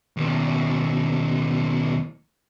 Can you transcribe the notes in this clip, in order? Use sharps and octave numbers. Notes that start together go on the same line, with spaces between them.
D#2 B2